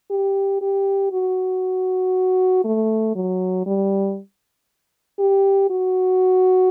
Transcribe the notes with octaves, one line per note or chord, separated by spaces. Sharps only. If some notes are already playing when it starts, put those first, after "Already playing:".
G4
G4
F#4
A3
F#3
G3
G4
F#4